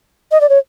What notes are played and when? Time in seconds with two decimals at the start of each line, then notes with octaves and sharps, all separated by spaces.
0.31 D#5
0.41 D5
0.49 C#5